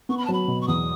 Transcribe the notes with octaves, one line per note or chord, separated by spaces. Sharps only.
B3 C#6
B5
A5
F#3 B5
B2
C#6
E2 D#6